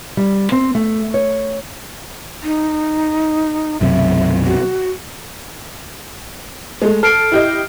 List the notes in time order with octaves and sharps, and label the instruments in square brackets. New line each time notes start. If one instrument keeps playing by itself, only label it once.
[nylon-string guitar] G3
C4
A3
C#5
[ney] D#4
[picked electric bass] B1 F#2 C3 [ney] E5
[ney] F#4
[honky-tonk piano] G#3 A3
[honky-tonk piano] A4 [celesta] F6 C7 D7
[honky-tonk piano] E4 G4 D#5